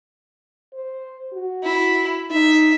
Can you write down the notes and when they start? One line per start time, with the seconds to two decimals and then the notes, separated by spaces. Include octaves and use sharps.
0.74 C5
1.33 F#4
1.63 E4
2.31 D#4 E5